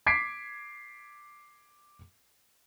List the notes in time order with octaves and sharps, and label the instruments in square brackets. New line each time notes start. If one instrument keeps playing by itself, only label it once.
[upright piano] D6 G#6 B6 C7 D7